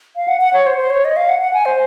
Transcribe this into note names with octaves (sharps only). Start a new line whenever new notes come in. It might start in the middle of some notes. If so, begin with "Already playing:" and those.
F5
F#5
F#5
C#5
C5
C5
C#5
D#5
F5
F#5
F#5
G#5
C5